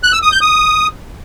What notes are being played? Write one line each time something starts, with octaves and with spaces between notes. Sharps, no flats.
F#6
E6
D#6
G6
D#6